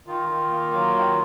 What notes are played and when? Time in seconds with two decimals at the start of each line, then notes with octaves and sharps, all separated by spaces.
0.06 D#3 F4
0.29 D#3
0.51 A#3
0.72 F#3
0.95 D#3